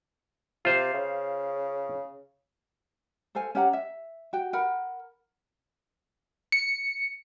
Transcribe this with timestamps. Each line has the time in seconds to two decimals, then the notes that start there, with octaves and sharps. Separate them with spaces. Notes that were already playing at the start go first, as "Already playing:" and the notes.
0.65 C3 F4 C5
0.94 C#3
3.35 A4 C5 F5 G#5
3.55 C#4 G4 F#5 A#5
3.73 E5
4.33 F#4 G5
4.53 A#4 F#5 B5
6.52 C#7